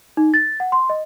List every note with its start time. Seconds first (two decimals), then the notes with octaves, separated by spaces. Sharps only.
0.17 D#4
0.34 A6
0.60 F#5
0.72 C6
0.90 D#5